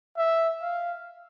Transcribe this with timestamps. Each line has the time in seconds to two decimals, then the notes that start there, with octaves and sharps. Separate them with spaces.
0.17 E5
0.62 F5